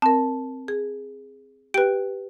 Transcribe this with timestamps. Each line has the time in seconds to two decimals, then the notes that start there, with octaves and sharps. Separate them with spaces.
0.02 C4 A#4 A5
0.68 G#4
1.74 G4 B4 G5 D7